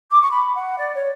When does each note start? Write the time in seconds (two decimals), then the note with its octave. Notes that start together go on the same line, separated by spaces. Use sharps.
0.11 D6
0.21 C#6
0.31 B5
0.55 F#5
0.78 D5
0.94 C#5